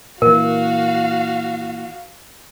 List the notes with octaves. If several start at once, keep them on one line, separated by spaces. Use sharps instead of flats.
A#2 E3 F#4 A#4 F5